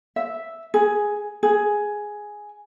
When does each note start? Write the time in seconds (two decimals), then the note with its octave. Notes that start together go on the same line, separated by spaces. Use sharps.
0.16 E5
0.74 G#4
1.43 G#4